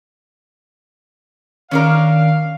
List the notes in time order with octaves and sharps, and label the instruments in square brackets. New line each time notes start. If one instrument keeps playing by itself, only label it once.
[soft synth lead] D#3 [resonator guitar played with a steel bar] C#4 D4 A#4 [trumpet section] F5